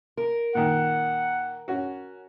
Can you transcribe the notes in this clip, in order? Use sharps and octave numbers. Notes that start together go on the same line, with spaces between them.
A#4
A#2 D#3 F#5
C#4 F#4